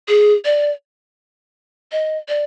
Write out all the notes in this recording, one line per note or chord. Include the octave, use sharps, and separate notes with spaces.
G#4
D5
D#5
D5